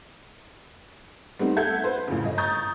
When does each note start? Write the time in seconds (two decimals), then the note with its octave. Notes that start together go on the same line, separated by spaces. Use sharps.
1.39 G3 A3 B3 C4 D#4
1.56 A4 E5 F#5 G6 G#6
1.84 B4 C5
2.08 A1 F2 C#3
2.24 G1 D#5
2.38 A#5 C#6 D#6 G6 A6